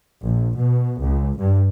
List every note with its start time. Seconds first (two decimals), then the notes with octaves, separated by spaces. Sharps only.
0.23 A#1
0.58 B2
1.02 C#2
1.37 G2